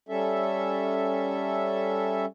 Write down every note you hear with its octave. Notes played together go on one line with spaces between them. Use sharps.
G3 C#4 A4 E5